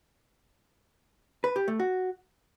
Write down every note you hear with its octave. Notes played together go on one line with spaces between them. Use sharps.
B4
G4
A3
F#4